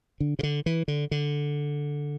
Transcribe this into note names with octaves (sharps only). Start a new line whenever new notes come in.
D3
C3
D3
E3
D3
D3